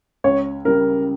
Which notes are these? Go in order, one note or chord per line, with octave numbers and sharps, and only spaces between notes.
C#2 C#5
C#3 G3 A#4